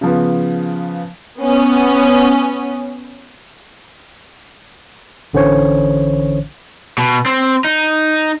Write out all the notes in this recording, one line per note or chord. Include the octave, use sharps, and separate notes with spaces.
C#3 F3 B3
B3 C#4
A1 D3 E3 C#4 C5 C#5
B2
C4
D#4